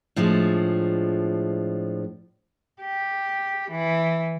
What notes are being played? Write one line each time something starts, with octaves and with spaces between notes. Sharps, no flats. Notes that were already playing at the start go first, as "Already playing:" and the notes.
A2 F3 G#3 D4
G4
E3